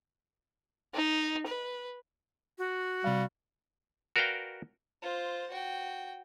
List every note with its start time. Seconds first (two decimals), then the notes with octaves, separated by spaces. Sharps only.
0.94 D#4
1.47 B4
2.58 F#4
3.04 C3 G3 F5
4.16 F#4 A#4 B4 D5 F5 G5
5.02 F4 C5
5.50 F#4 G5